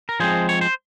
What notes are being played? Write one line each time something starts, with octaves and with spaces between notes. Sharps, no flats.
A#4
F3 G#3 C4 G#4 C5
C#5
C5